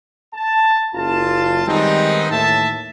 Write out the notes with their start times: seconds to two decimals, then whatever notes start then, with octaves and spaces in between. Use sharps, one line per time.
0.34 A5
0.94 F#1 F4 A5
1.67 D#3 G3 G#3 B3 C4 D#4
2.31 D#2 A2 E3 E5 A5